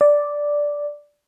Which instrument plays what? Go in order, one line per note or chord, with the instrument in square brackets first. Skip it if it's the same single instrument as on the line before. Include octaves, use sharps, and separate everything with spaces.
[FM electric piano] D5